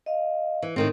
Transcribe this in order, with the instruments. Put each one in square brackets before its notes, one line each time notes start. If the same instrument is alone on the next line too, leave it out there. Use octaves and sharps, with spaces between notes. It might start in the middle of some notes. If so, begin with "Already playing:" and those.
[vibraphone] D#5 F5
[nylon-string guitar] E3
A2 D#3 C4